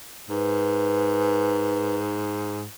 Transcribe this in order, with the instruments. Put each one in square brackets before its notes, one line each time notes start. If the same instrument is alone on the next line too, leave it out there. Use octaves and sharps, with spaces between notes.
[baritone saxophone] G#2 [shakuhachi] B4